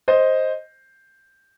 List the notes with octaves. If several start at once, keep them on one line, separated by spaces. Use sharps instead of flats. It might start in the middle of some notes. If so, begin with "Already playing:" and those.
C5 D#5